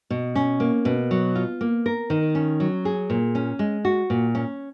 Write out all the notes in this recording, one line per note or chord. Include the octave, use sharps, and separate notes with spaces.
B2
C#4
A#3
B2
F#3
F4
A#3
A#4
D#3
C#4
F#3
G#4
A#2
C#4
G#3
F#4
A#2
C#4